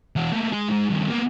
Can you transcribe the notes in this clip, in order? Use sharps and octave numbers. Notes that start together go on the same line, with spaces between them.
E3 F#4
A3 A#3
G#3 G#4
G#2 G#3
G2 D#3
A#3 B3